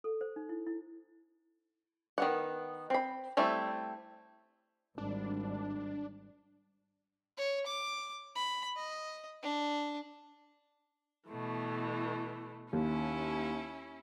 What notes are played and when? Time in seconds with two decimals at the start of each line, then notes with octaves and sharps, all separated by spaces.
0.04 A4
0.21 C5
0.36 D#4
0.49 E4
0.67 E4
2.18 D#3 B3 F#5
2.90 C4 B5
3.37 G3 A3 C4 E4
4.98 G#1 G3 D4
7.37 C#5
7.67 D6
8.35 B5
8.76 D#5
9.43 D4
11.29 B2 E3 A3
12.73 D#2 C#4 E4